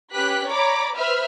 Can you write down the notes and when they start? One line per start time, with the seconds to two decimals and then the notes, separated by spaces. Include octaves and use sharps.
0.11 C#4 G4 B4 F#6 B6
0.47 C#5 D5 A#5 B5 D6
0.94 B4 C5 E5 B5 F6